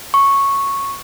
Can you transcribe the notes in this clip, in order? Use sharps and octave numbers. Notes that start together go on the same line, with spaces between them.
C#6